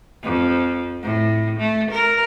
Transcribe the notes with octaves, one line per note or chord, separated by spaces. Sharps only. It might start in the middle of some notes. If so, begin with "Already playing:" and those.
F2
A2
A3
A#4